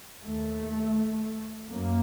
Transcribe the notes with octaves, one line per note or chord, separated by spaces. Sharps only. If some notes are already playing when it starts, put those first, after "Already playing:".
D#2 A3
F#2 A#3